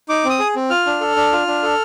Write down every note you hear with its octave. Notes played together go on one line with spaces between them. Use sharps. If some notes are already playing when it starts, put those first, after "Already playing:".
D#4 D6
C4 D#6
G#4
C4
F4 F6
D4
A4
D4
F4
D4
A4